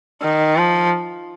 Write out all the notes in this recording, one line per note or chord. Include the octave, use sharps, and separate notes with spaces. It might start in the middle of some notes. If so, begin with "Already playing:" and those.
D#3
F3